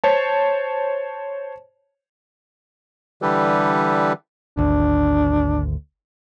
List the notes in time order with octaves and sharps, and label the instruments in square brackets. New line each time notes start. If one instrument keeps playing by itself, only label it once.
[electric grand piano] C5 C#5 A5
[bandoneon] D3 E3 G3 G4 A4 B4
[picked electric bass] G#1 D2 [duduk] D4